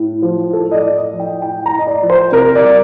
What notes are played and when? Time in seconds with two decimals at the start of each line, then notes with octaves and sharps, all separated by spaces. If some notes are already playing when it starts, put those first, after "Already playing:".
Already playing: A2
0.22 F3
0.53 A2 A4
0.71 D#5
0.75 D5
0.83 A2
0.98 D#5
1.13 F3
1.20 G5
1.42 A2 G5
1.66 A#5
1.73 A2
1.79 D#5
1.87 D5
2.03 F3
2.10 C5
2.32 C3 A#4
2.55 D5
2.63 G3